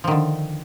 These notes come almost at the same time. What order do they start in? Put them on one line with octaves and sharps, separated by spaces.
F3 D#3 D3